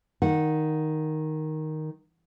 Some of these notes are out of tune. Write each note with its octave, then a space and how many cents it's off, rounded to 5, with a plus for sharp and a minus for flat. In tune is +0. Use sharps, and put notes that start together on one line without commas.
D#3 +0 F#5 -20